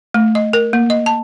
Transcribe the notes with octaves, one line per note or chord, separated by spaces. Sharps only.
A3
D#5
A#4
A#3
D#5
A5